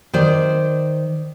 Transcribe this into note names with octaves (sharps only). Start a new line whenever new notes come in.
D#3 C5 D5